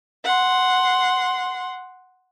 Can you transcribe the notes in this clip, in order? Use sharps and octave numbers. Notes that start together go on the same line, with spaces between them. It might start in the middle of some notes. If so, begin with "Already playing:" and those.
F#5 C6